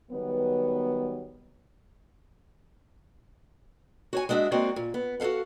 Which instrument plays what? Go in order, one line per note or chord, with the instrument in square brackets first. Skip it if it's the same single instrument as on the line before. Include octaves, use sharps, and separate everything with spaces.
[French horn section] D#3 F#3 G3 B3
[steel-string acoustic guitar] F#4 C#5 G#5
G#3 D4 F#4 D#5 E5
G#3 A#3 C4 F#4 D5
A#2
B3
F#4 A4 C5 F5 F#5